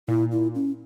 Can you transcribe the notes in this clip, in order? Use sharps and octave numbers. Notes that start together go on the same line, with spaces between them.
A#2 E4
E4
C#4